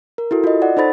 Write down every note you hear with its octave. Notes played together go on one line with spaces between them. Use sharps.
A#4
E4 F#4 A4
F4 D#5
D5 F#5
D#4 A4 C5 B5 A6